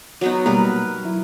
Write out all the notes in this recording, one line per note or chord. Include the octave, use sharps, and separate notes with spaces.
F#3 B3 D#4
B2 G3 A#3 A#4 B4
F#3 E4